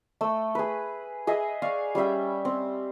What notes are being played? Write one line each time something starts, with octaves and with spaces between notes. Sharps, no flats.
A3 E6
G#4 B4
G#4 D#5 E5
D5 F5 C#6
G3 C#4 E5 G5
C4